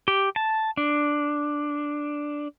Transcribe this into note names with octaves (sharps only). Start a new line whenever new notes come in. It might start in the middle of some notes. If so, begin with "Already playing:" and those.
G4
A5
D4